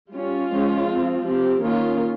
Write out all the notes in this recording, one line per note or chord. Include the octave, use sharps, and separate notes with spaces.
G3 C#4 F4
F3 G#3 C#4
F3 C4
F3 C4 G4
D#3 A#3 C#4 F4